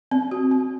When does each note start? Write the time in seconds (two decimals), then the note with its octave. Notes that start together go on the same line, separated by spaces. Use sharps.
0.11 C4
0.31 F#4
0.51 C4